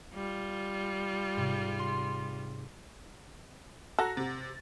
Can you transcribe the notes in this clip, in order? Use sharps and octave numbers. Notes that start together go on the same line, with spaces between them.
G3 F4
G#2 C3
C6
F#4 A4 F#5 A#5 A#6
C3 A6